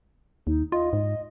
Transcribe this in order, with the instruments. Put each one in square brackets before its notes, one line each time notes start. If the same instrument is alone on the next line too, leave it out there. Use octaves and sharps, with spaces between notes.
[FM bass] D#2 [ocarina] D#4
[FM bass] F4 [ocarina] D#5
[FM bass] G#2